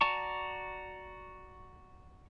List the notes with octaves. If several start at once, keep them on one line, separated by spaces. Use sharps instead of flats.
F#4 D5 A5 A#5 C#6